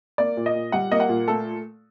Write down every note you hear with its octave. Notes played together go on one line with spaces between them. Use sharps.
A#3 D5
A#2
D#5
A#2
G3 F#5
A#3 D#5
F#5
A#2
A3 A4